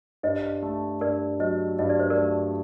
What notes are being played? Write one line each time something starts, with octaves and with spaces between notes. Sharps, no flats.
G2 C5 D#5
A3
G2 A#4 D5
F#3 C5 D#5
G2 D#5
D5
C5
A#4 D5
A3